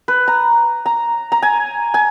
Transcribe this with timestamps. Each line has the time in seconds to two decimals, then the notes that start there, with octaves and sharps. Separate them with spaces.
0.08 B4
0.28 A#5
0.86 A#5
1.32 A#5
1.42 G#5
1.94 G#5